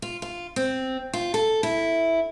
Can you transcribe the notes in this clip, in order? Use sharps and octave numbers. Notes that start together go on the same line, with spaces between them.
F4
F4
C4
F4
A4
E4